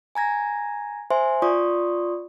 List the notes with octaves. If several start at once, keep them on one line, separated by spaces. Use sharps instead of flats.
G#5 A#5 G#6 A#6
C5 E5 G#5 C6
F4 D5 C6 C#6 D#6